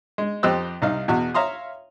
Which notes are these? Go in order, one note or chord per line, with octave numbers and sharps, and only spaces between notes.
G#3
F2 G4 C5 D#5 E6 F#6
C2 D#4 F5
E2 B2 F#4
C#5 E5 F5 A#5 C6 D#6